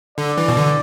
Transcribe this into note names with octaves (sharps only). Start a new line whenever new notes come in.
D3 D5
E3
B2
D3